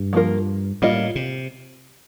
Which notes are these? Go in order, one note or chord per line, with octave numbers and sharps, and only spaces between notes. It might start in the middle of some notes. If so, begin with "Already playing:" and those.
Already playing: G2
F3 A#3 F4 A#4
A2 G3 A#3 F4 A#4 D#5
C3